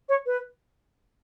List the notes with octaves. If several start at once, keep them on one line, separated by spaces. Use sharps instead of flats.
C#5
B4